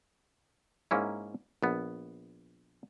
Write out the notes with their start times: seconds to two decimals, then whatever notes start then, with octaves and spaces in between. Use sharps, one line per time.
0.91 G#2 A#3 C#4 E4
1.63 A#1 B3